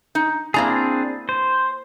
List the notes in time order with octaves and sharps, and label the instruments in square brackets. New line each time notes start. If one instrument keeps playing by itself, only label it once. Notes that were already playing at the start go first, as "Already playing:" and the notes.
[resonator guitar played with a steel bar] D#4
[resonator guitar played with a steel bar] A#3 E4 A#5 [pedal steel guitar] C4 D4 G#4
[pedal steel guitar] C5